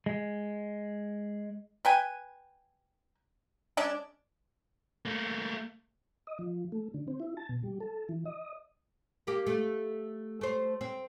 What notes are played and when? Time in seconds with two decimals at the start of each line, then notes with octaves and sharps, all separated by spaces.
0.06 G#3
1.85 B4 G5 G#5
3.77 G#3 C#4 D4 D5
5.05 A3 A#3
6.27 D#5
6.39 F3
6.72 A3
6.94 D3
7.08 C4
7.20 E4
7.37 A5
7.49 B2
7.63 G3
7.80 A4
8.09 E3
8.25 D#5
9.27 A#3 G4
9.47 A3
10.41 A3 C5
10.81 C4